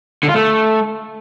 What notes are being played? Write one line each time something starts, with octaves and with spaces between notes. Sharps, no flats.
D3
F4
A3